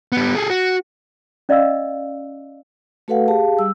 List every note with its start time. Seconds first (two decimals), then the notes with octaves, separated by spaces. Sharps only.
0.12 G3 B3
0.35 G#4 A4
0.50 F#4
1.49 C#4 D5 D#5 F5 E6
3.08 A3 F#4 A4 B4 F5 F#5
3.28 G4 G#4 F5 A5
3.59 G3 E6